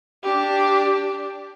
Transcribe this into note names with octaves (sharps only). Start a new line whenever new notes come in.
D4 G4